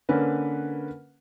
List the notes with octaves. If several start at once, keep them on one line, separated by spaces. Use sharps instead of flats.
D3 A#3 C#4 B4